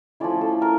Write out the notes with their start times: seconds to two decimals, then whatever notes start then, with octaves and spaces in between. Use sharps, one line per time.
0.20 F3 A3 C#4 E4 D5
0.41 A4
0.62 A#4